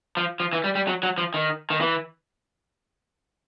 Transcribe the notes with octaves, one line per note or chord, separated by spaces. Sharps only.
F3
F3
E3
G3
G3
F#3
F#3
F3
D#3
D#3
E3